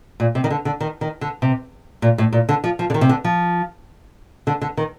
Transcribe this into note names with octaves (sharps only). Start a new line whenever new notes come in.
A#2
C3
D#3
D3
D3
D#3
D#3
D3
C3
A#2
A2
A#2
D3
F3
F3
D3
D#3
C3
D3
F3
D3
D3
D#3